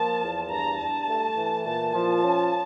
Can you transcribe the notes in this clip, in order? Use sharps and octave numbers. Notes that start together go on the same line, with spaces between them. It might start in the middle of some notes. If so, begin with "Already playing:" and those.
Already playing: F3 A#3 A5
E2
G2 A#5
G2 A5
A3
E3
A#2 A5
F3 A5
C#4